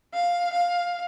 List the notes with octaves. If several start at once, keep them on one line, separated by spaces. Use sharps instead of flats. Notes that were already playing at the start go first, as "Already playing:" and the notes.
F5
F5